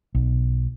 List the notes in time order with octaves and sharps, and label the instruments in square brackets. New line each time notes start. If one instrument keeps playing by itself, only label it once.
[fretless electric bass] B1